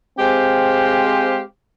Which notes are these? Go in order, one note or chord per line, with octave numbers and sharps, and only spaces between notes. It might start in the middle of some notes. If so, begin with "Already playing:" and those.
G#3 C4 G4 C5 F5